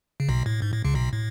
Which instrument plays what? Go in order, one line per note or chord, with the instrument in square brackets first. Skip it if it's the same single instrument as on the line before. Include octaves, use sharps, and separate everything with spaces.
[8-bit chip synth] C#3
B1 B2
A2
G#2
A2
C#2 C#3
B1 B2
A2